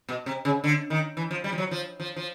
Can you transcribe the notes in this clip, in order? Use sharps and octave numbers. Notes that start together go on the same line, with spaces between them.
B2
C3
C#3
D3
D#3
E3
F3
G3
F3
F#3
F3
F3
F3